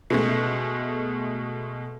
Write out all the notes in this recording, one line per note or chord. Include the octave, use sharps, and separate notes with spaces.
B2 G#3 A3